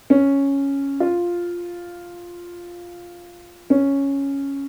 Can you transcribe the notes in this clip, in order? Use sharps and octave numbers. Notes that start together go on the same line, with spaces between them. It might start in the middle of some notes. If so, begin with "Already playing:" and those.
C#4
F4
C#4